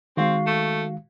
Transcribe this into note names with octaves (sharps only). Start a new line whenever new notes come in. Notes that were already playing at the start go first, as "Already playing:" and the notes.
D#3 G#3 C4 F#4 F5
A3